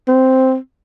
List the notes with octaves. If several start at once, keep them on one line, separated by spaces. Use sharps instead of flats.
C4